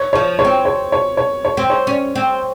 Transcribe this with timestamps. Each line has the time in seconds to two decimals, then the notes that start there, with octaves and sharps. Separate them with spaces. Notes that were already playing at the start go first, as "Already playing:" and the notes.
Already playing: C#5
0.13 F3 C#5
0.39 C#5
0.45 C4
0.65 C#5
0.92 C#5
1.17 C#5
1.45 C#5
1.57 C4
1.70 C#5
1.87 C#4
2.15 C4